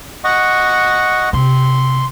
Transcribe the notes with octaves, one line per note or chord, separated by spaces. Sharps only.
D#5 F#5 C#6
C3 C6